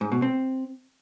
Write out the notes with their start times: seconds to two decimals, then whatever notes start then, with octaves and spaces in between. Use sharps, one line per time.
0.01 G#2
0.12 B2
0.22 C4